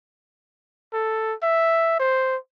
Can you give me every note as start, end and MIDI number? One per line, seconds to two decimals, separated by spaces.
0.93 1.34 69
1.43 1.98 76
2.00 2.36 72